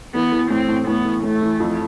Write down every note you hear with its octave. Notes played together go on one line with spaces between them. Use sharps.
E3 B3
E3
A2 C4
A2
A2 B3
E3
A2 A3
E3
F2